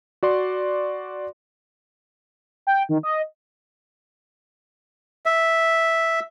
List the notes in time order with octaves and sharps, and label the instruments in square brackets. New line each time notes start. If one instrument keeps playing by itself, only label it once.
[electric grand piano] F#4 D5 C6
[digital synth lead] G5
D#3
D#5
[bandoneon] E5